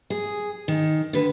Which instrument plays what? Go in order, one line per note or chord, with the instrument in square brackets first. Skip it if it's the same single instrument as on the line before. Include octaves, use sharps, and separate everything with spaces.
[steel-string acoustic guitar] G#4
D#3
D3 B4